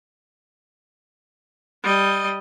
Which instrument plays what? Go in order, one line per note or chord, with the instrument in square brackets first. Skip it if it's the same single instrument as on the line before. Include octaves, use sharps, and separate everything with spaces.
[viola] G3 D#5